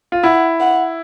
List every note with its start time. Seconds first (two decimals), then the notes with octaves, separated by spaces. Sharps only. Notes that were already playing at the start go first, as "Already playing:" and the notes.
0.12 F4
0.23 E4 F#5
0.60 F#5